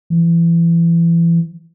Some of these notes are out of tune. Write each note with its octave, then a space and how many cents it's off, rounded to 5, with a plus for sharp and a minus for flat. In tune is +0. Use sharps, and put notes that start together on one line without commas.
E3 +30